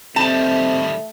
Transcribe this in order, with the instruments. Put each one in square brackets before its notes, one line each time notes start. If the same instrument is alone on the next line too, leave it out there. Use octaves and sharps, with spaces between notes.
[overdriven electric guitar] D#3 G3 [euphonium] A3 [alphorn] C4 [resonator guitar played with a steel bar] A5